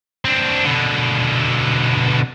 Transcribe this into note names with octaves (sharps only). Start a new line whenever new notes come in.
C4 D4
B2 D3